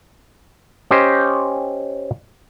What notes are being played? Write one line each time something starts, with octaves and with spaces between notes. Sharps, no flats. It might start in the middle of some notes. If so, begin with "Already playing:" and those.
C#4 G4 C5 D#5